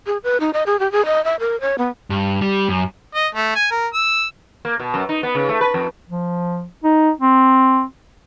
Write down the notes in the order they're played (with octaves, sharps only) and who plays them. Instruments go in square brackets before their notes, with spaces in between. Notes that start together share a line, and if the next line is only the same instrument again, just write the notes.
[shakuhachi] G#4
B4
D#4
D#5
G#4
G4
G#4
D#5
E5
A#4
C#5
B3
[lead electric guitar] G2
G3
F#2
[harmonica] D#5
A3
G#5
A#4
E6
[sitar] A#3
B2
F#2
D#4
B3
C#3
A3
B4
F2
[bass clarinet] F3
D#4
C4